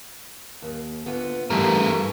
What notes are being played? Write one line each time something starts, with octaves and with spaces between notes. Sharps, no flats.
D#2
D2 B3 F4
G2 E3 G3 A3 A#4